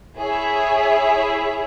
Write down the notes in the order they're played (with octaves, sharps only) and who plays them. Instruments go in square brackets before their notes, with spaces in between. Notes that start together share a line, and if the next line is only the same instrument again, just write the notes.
[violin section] E4 G#4 C#5 E5